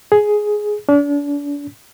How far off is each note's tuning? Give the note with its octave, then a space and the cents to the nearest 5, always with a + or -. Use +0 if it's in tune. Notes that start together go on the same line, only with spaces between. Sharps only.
G#4 +10
D4 -35